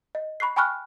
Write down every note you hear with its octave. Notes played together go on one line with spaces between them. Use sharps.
D#5
B5 C#6 F#6 C7
G5 G#5 B5 C#6 F6 F#6